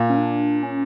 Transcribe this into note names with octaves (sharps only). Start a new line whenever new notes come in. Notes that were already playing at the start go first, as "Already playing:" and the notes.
Already playing: A#2
C#4
D4
C#4